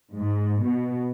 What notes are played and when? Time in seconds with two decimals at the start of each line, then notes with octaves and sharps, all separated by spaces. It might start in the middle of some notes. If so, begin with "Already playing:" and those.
0.17 G#2
0.64 B2